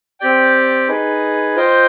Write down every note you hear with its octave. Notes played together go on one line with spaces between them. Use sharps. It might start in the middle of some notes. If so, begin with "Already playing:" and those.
C4 G4 D5 G5
D#4 G#4 B4
F4 C5 D#5 G5